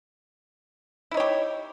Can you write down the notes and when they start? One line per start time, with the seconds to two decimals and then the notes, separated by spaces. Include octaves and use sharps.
1.11 E4
1.14 D#4
1.17 C#5
1.20 G4